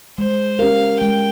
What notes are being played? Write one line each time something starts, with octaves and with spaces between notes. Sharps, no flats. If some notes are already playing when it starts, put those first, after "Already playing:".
G#3 C5
C#4 G4 A#4 F5
G#3 G5